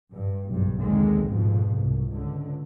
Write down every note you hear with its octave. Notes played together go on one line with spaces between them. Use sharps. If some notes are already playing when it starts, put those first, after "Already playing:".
G2
F#1 B1 G2
D#2 D3 D#3 G#3 C4
A#1 F2 G#2 B2
C2
C#2 D3